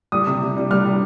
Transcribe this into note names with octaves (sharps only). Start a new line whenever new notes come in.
G3 D#6
C3
G3
G3
G3 F6
G3